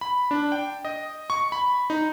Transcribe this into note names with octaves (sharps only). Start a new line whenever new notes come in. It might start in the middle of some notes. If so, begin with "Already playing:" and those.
B5
D4
G5
D#5
C#6
B5
D#4